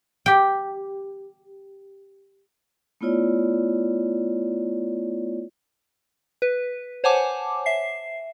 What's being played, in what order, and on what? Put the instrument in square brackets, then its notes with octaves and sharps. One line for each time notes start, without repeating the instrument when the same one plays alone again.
[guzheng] G4 G5
[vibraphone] A3 B3 E4 F4 C#5 D5
[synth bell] B4
C5 C#5 F#5 G#5 A5 D6
E5 C7